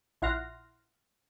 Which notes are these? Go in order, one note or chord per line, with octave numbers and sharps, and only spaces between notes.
A#1 E4 F#5 C6 F6 A#6